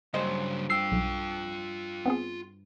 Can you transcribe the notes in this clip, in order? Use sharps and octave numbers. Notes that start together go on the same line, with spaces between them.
G2 C#3 F#3 C5 D#5
F4 G5 E6 C7
B1
B3 C4 G#4